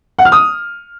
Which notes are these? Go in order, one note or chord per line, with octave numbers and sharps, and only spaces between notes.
F#5
F6
D#6